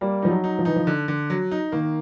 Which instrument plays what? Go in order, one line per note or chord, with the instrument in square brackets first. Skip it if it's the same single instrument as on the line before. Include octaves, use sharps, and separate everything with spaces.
[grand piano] G3 [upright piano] A#3
[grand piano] F3 [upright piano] D#4
[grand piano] F#3
[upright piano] D#4
[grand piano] F3
[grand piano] E3 [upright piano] D#4
[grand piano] F3
[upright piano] D3
D3
F#3
D#4
[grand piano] D#3 [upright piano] A#3